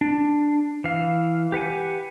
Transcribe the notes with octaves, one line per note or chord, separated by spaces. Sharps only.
D4
E3 F5
G4 B4 F#5 G#5